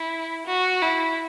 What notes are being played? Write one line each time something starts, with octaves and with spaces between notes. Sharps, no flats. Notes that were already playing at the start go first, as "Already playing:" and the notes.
Already playing: E4
F#4
E4